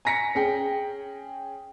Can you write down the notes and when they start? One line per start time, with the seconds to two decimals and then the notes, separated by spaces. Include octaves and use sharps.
0.05 G#5 A#5 A#6 B6 C#7
0.35 C#4 G#4 G5